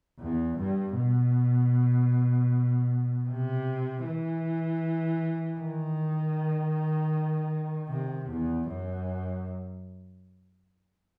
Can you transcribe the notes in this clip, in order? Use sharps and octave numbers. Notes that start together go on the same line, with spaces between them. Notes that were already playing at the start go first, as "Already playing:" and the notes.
E2
G2
B2
C3
E3
D#3
C3
E2
F#2